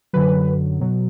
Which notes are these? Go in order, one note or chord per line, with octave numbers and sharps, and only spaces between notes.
F#2 D3 F#3 B4
B2 F#3